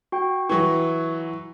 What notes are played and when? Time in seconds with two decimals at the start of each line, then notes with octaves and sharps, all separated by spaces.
0.12 F#4 G5
0.49 E3 F#3 C#6